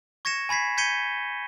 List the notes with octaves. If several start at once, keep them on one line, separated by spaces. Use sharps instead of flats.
C#6 G#6 A#6 C#7 E7
G#5 B5 G#6 B6 C7
G6 G#6 B6 C#7 D#7 G7